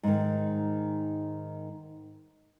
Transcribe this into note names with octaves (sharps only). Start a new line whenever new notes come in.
G#2 D#3